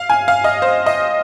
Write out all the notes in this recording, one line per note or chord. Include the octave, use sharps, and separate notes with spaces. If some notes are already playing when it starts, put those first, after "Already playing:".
Already playing: F5
G#5
F5
D#5
C5
D#5